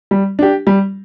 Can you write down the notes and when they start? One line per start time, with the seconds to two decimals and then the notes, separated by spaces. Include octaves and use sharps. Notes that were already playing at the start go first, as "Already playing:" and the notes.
0.11 G3
0.39 D4 G4
0.67 G3